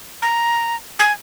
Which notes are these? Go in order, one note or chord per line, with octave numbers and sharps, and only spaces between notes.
A#5
G#5